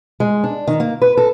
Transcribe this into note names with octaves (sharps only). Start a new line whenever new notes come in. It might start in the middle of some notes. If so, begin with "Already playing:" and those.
G#3
D4
D#3
A#3
B4
A4